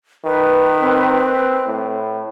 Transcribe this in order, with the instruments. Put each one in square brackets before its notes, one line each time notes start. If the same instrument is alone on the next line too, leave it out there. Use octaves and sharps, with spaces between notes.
[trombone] D#3 [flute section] B4
[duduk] C4
[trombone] A2